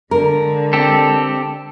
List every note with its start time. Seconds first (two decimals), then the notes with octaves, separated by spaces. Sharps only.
0.11 D3 G#3 A#4
0.73 C4 G4 A4